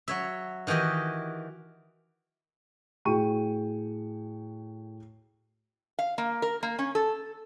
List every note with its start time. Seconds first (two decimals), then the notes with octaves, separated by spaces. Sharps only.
0.08 F#3 C#5 E5
0.67 D#3 E3 F#4 G4 D#5
3.05 A2 F#4 G#4 G5 C#6 D#7
5.99 F5
6.18 A#3
6.42 A#4
6.63 A#3
6.79 C#4
6.95 A4